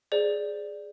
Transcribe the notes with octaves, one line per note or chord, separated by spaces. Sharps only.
G#4 C5 D5